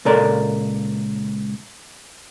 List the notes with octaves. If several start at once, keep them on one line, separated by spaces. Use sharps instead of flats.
C#2 A#2 A4 A#4 D5